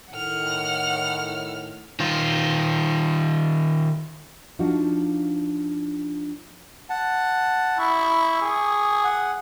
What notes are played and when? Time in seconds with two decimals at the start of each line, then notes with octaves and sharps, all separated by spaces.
0.12 A2 D#3 F#5 F6
2.00 D#3 F4
4.59 F3 D4 D#4 F4 F#4
6.90 F#5 A5
7.79 E4 C#6
8.42 G#4
9.04 F#5